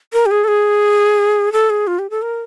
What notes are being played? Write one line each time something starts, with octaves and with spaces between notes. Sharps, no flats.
A#4
G4
G#4
A4
G#4
A4
G#4
F4
G4
A4
A#4